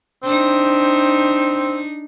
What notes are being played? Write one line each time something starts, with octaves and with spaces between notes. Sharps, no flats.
C4 D4 D#4